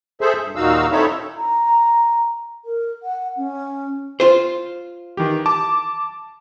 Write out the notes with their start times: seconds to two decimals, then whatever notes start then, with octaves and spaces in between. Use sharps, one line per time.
0.21 G#4 A4 C5 E5
0.41 G2
0.56 D#2 A#2 D#4 F#4 F5 E6
0.92 C4 D#4 E4 A4 C#5 E5
1.37 A#5
2.65 A#4
3.03 F#5
3.37 C#4
4.20 F4 C5
5.17 D#3 E3 G4
5.46 A5 D6